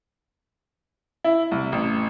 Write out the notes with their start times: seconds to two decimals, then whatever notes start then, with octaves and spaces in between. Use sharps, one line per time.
1.24 E4
1.51 C2
1.72 A1